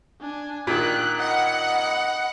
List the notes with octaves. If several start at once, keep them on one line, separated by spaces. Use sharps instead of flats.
D4 G#5
A#2 D#3 F#6
D#5 F#5 B5